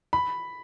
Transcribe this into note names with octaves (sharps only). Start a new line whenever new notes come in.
B5